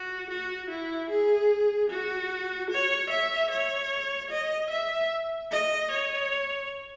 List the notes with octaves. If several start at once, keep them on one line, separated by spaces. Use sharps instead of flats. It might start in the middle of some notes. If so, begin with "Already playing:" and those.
Already playing: F#4
F#4
E4
G#4
F#4
C#5
E5
C#5
D#5
E5
D#5
C#5